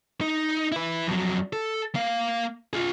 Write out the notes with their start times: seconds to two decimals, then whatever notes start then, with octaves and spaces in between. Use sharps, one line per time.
0.21 D#4
0.72 E4 B4
1.07 F2 F#3
1.53 A4
1.95 A#3 F5
2.73 F4 G#4